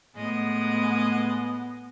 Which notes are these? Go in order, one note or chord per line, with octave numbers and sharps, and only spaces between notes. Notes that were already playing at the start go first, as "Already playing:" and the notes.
A2 G#3 B3 D#5